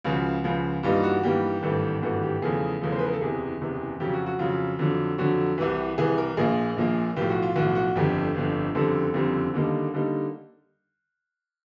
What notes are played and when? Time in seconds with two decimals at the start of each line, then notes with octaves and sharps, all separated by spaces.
0.05 C#2 C#3 F3 F#4
0.44 C#2 C#3 F3
0.83 G2 E3 G3 A#3 D#4 F4
1.03 F#4
1.23 G2 E3 G3 A#3 D#4 G4
1.62 G#1 G2 E3 A3
2.02 G#1 G2 E3 A3 F#4
2.23 G4
2.42 E2 C#3 F3 A3 G#4
2.81 E2 C#3 F3 A3
2.92 C5
2.99 B4
3.07 A#4
3.13 A4
3.21 F#1 E2 C3 G#4
3.61 F#1 E2 C3
4.00 F2 C#3 F#3 G4
4.13 F#4
4.26 F#4
4.39 F2 C#3 F#3 F4
4.79 F2 D3 F#3
5.18 F2 D3 F#3 F#4
5.58 C2 C3 E3
5.98 C2 C3 E3 G#4
6.18 A#4
6.37 A#1 A#2 F3 A#3 G#4
6.77 A#1 A#2 F3 A#3
7.16 B1 A2 F3 G4
7.29 F#4
7.42 F4
7.56 B1 A2 F3 F#4
7.75 F#4
7.95 G1 F2 D3 G4
8.35 G1 F2 D3
8.74 F#1 F2 D3 G3 C4 A4
9.14 F#1 F2 D3 G3 C4
9.54 D#2 D3 G3 A#3 D#4
9.94 D3 G3 A#3 D#4